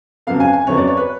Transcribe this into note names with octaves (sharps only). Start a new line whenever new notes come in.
F2 C#3 F#3 B3 F5
G#5
G#5
F2 C#3 F#3 B3 C#5
D5
C#5
B4